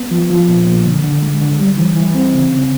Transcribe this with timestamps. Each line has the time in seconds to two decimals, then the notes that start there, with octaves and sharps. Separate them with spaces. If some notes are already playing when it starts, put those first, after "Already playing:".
Already playing: B3
0.11 F3
0.30 F3
0.48 A#2
0.67 A#2
0.85 D3
1.04 D3
1.22 G#3
1.41 D3
1.60 G3
1.78 E3
1.97 E3
2.14 C4
2.34 C#3
2.52 C#3